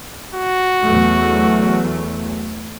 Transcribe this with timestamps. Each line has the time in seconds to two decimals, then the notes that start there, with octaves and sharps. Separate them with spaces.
0.35 F#4
0.83 E2 F#3 A3